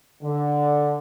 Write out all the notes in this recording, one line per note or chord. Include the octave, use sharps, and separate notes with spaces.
D3